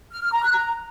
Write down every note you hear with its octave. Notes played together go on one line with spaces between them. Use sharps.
F6
F6
A#5
F#6
A#5